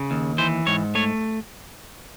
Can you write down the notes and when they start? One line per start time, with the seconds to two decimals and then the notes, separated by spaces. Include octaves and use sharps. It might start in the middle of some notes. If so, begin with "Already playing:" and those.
Already playing: C#3
0.11 D#2
0.38 E3 C5
0.67 G#2 C#5
0.95 A3 C#5